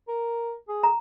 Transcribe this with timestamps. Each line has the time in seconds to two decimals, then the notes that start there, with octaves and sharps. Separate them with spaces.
0.08 A#4
0.68 G#4
0.83 A#5